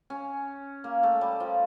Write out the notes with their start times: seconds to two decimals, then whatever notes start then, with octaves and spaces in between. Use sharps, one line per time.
0.10 C#4
0.84 A#3
1.03 A3
1.21 G3
1.40 F3